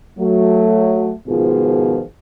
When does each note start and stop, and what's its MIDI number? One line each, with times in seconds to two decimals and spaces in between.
0.19 1.11 54
0.19 1.11 57
1.27 2.02 44
1.27 2.02 47
1.27 2.02 51
1.27 2.02 53
1.27 2.02 65
1.27 2.02 68